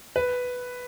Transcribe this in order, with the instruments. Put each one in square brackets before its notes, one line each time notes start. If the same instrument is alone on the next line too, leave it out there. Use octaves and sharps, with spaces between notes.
[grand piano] B4